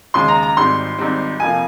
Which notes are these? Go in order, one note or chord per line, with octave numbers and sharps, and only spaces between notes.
D#2 C#3 G#3 C6
A#5
A#5
G#1 G#2 G3 C4 C6
G#1 G#2 G3 C4
F2 C3 F3 A#3 G#5